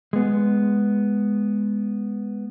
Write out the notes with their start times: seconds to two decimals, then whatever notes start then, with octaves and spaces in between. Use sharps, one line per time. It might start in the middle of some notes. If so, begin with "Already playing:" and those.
0.13 G#3 B3